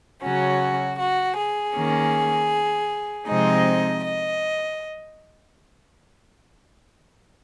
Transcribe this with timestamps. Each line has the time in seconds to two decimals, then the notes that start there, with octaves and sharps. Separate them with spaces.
0.22 C#3 F#3 C#4 F#4
0.99 F#4
1.37 G#4
1.75 D#3 A#3 C#4
3.27 C3 F3 G#3 C4 D#4 D#5
4.03 D#5